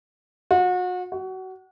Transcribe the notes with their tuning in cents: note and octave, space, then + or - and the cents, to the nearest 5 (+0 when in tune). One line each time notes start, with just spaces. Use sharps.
F#4 -35
F#4 +25